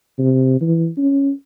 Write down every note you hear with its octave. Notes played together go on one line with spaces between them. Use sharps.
C3
E3
C#4